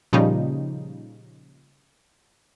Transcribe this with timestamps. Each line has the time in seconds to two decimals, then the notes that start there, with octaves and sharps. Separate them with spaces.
0.13 A#2 C#3 F3 G3 D#4